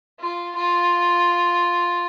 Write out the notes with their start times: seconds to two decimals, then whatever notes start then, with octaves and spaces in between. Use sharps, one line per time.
0.20 F4
0.56 F4